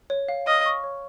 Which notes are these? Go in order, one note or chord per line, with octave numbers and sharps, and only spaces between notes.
C#5
F5
D#5 F6
C#6
C#5